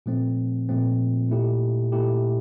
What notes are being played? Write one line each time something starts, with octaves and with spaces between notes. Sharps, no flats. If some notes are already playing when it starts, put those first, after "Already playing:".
A#2 F3 A3 C4
A#2 F3 A3 C4
A#2 A3 E4 G4
A#2 A3 E4 G4